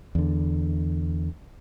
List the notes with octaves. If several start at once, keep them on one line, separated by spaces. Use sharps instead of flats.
E2 D3